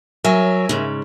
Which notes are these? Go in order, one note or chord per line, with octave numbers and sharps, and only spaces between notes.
F#3 A#4 E5 G#5
G#2 C#3